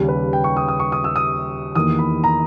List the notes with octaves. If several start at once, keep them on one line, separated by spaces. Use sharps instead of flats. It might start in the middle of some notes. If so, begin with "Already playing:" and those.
Already playing: D#2 C#3 G3
B4
G5
C#6
D#6
D#6
C#6
D#6
E6
D#6
E2 D#3 A#3 D#6
B5
A#5